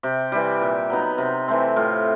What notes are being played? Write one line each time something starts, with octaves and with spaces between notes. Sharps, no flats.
C3 G4
E3 G3 G4
A#2
F#3 B3 D#4
C3
E3 A3 C4
A2 F4